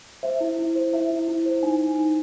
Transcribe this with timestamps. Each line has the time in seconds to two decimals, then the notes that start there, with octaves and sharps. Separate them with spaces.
0.23 C5 E5
0.41 E4
0.59 E4
0.75 C5
0.93 E4 E5
1.11 E4
1.28 E4
1.46 C5
1.63 D#4 G#5
1.80 D#4
1.98 D#4